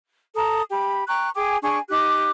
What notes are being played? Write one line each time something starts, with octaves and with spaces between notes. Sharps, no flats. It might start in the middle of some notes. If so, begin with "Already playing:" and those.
A4 A#5 D#6
G4 B5
G5 A#5 C#6 F#6
G#4 G5 G#5 D6
D4 G#4 G#5 C#6
D#4 G4 D6 F#6